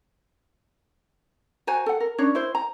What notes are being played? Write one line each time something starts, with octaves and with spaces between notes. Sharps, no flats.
F#4 C5 G#5 A#5
A4 F#5
A#4
C#4 D4 A#4 C#5
E4 C5
A#5